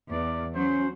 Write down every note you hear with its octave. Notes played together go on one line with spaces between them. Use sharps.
E2 D5
F#3 C#4 C5